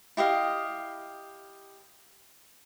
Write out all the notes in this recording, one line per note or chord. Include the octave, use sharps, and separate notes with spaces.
E4 G4 D#5 F5